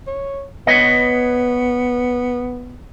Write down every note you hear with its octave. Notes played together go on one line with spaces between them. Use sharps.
C#5
B3 B4 C#5 D#5